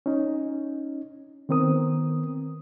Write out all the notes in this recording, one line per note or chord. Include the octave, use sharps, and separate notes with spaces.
C#4 D#4
D#3 B3 C4 A#4 D#6